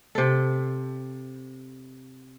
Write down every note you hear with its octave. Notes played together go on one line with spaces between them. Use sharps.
C3 A4